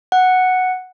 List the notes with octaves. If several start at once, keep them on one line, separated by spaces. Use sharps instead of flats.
F#5